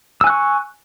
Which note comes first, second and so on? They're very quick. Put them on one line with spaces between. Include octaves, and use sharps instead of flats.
E6 G#5 F#6 C#6